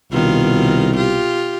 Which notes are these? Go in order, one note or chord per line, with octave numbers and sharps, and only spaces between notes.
C2 B2 D#3 F4
F4 G4